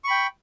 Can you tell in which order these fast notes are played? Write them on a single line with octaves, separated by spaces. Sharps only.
C#6 B5 G5